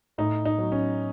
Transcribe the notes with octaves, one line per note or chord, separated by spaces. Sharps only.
A2 D#4
D#4
F#3
C#4